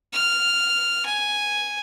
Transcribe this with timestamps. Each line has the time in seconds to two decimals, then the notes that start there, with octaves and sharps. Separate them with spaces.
0.13 F6
1.06 G#5